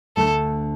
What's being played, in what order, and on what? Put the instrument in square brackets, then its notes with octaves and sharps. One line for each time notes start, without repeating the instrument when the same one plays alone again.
[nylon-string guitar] D2 D3 A3 [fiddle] A4